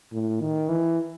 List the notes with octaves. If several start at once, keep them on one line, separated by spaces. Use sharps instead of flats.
A2
D#3
E3